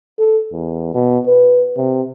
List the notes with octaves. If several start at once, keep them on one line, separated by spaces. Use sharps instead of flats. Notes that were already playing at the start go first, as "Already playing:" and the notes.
A4
E2
B2
B4
C3